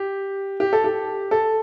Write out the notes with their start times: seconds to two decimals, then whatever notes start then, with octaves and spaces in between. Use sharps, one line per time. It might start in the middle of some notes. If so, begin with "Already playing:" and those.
Already playing: G4
0.60 G4
0.73 A4
0.84 G4
1.31 A4